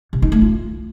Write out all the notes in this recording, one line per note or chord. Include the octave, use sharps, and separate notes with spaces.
C3
D#4
A3
F4